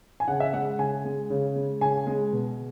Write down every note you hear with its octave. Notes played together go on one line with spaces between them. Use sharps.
G#5
C#3 F#5
E5
G#3 F#5
C#3 G#5
G#3
C#3
G#3
C#3 G#5
G#3
B2